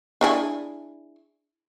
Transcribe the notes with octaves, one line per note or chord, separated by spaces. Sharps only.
D4 E4 G#4